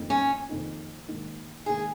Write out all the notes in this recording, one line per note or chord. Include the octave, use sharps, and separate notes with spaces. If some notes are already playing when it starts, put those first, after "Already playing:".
Already playing: F2 D#3 A#3 D#4
C#4
F2 D#3 A#3 D#4
G#2 D#3 A#3
G#2 D#3 A#3 G#4